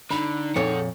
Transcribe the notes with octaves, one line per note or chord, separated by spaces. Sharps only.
D3 D#4 B5
F2 A#2 G#4 A4 C#5 F#5